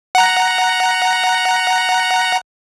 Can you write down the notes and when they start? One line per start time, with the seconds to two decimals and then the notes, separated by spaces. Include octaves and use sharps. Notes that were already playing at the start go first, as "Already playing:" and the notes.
0.15 F#5 A#5